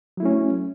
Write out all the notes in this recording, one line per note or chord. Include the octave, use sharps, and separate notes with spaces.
F#3 A3 C#4 E4